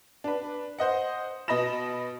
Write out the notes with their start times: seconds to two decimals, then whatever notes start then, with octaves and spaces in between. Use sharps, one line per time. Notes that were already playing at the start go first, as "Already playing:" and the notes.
0.24 D4 B4
0.78 C5 D#5 F#5
1.48 B2 D#5 B5 A#6 E7